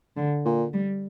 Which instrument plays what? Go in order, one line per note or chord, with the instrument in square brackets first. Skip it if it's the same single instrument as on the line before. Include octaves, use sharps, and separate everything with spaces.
[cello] D3
[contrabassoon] A#2
[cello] G3